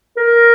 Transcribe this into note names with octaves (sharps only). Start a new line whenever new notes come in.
A#4